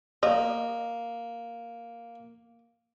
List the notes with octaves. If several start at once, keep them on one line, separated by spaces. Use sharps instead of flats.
A#3 D#5